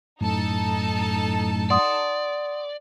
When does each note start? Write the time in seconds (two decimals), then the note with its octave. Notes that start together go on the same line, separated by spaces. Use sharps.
0.21 F#2 A2 D#4 A4 A5
1.70 D5 F#5 C6 D#6